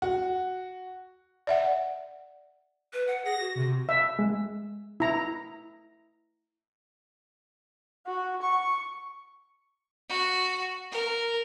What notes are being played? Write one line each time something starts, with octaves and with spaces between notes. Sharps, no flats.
F#4
D5 E5 F#5
B4
F#5
G#4 A#6
F#4
C3
E5
G#3
E4 A#5
F#4
C#6
F#4
A#4